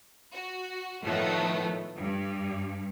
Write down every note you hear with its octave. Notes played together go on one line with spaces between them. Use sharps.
F#4
A2 D#3 F3 A3 B3
G2